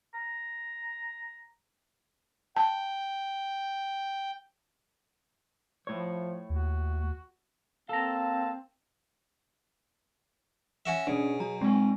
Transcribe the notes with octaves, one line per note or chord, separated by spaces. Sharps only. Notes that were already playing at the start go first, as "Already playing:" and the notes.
A#5
G5 A5
A2 F3 C#5
D#2 F#4
A#3 C4 A4 F5 A5 A#5
C#4 F#4 E5
B2 C#4 D4 G#4 C#5
F#3 F#4 A#5
G#3 C4 G#5